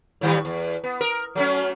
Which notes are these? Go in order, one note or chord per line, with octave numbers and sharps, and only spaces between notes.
A2 D#3 G3
E2
B3
A#4
F#3 A3 C#4